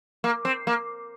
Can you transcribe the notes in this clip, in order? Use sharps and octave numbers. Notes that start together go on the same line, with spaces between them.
A#3
C4
A#3